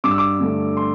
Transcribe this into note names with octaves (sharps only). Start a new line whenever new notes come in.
G2 D6
E6
D6
D3 A3
C6